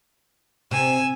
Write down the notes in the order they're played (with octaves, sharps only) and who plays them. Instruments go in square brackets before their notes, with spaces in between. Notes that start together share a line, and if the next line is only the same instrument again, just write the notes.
[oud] C3 [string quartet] G#5 E6